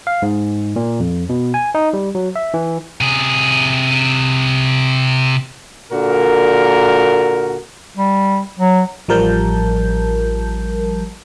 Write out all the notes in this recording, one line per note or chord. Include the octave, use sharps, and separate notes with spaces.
F5
G#2
A#2
F2
B2
G#5
D#4
G3
F#3
E5
E3
C3 G#4
A#2 D3 F#4 A#4
G3
F#3
A1 F3 G3 A#4 A5 G6